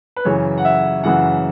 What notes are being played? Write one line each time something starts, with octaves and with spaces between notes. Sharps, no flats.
B4
F#2 C#3 E3 C#5
F#5
E5
F#2 C#3 E3 F#5